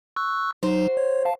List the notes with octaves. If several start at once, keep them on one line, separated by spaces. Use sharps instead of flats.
C#6 E6 F#6
F#3 D#4 F#4 C5
C#5
F5 A5